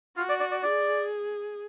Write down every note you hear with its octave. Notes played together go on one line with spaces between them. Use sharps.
F4 F#4
D5
D5
D5
G#4 D5